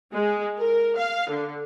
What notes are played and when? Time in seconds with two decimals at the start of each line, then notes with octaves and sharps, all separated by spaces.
0.14 G#3
0.59 A#4
0.97 F5
1.30 D3